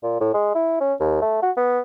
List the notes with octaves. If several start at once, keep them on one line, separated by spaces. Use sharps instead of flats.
A#2
A2
G#3
E4
C#4
D#2
A3
F#4
B3